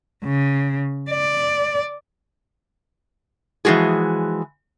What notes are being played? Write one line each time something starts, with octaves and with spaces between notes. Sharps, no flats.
C#3
D5
E3 F3 G#3 F#4 G#4